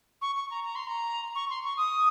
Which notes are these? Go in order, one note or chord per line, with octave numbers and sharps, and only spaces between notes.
C#6
C#6
A#5
A#5
C6
A#5
C#6
C6
C#6
D#6